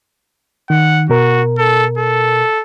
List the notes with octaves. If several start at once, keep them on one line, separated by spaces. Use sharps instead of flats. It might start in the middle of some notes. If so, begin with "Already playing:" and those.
D#3 F#5
B2 F#4 A#4
A4
A4